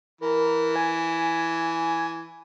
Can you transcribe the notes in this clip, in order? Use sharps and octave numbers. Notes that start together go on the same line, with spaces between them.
E3 A#4
G#5